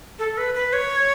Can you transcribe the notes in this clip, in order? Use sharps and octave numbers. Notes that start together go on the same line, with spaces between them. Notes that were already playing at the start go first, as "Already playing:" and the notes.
A4
B4
B4
C#5